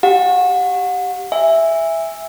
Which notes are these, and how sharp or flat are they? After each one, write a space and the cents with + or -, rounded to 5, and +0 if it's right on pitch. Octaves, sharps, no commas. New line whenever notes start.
G4 +0 F#5 -35
E5 +0 G#5 -20